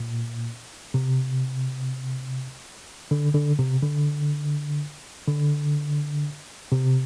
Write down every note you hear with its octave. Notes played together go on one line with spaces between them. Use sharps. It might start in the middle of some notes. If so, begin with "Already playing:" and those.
Already playing: A#2
C3
D3
D3
C3
D3
D3
C3